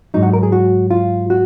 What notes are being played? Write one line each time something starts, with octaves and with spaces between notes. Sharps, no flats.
G#2 F#3 D#4
F#4
A#4
G#4
F#4
F4
F#4